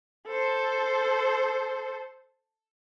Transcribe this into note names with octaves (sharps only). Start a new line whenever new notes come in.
A4 C5